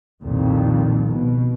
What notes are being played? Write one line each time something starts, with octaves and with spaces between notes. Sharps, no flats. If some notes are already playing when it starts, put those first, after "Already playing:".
C2 F2 A#2 D#3
B2